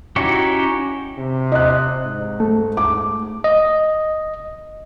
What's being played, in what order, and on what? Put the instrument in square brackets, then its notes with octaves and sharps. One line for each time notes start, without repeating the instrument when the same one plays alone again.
[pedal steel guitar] C#4 D#4 E4 F#4 G4
[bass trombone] C3
[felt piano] D#5 F#6
[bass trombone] G#2
[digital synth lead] A3
[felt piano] D6
[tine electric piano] D#5